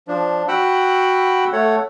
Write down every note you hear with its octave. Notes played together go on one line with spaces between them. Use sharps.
F3 D4
F#4 F#5 G5 B5 E6 F#6
A3 A4 C#5 F#5